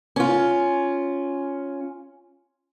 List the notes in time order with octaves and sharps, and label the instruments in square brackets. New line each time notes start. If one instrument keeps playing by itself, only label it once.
[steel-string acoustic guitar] C#4 F4